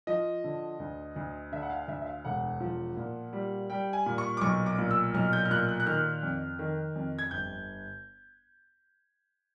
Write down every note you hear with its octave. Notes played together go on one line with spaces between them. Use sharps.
F3 D#5
D3
D2
D2
D3 E5
F#5
F5
D2 E5
E5
F5
E1 F#5
F3
A#2
G3
G3 G5
G#5
A#2
C#6
D6
B1 C#6
D6
A#2
E6
B1 F6
G6
F6
A#2 F#6
F#6
F#6
D#3 F6
F2
D#3
F2
G#6
G1 G6